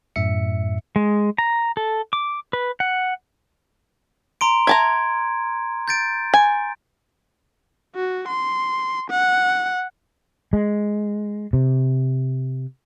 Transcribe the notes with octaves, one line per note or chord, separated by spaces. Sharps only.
F#2 A2 E5 C#7
G#3
A#5
A4
D6
B4
F#5
A#5 C6 D7
E5 A5 A#5 G#6
G6 A6 D7
G#5
F#4
C6
F#5
G#3
C3